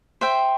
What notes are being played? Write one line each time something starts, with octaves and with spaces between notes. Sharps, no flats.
C5 E5 G5